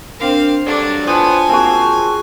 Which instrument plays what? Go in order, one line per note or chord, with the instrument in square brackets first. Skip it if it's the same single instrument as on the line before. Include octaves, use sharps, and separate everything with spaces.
[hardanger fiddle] C4 F5 [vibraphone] D4 A#4
[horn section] G2 F#3 D5 [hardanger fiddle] D4 [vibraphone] A4
[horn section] A2 B3 C5 [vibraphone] F4 A5 [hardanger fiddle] G#5
[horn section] A#3 C4 [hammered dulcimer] F#4 G#4